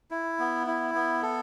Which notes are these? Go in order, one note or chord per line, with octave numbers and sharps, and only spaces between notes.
E4
B3
E4
B3
A4